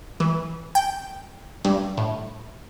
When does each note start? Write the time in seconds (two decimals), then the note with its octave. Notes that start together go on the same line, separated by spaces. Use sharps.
0.20 E3
0.75 G5
1.65 G2
1.97 A2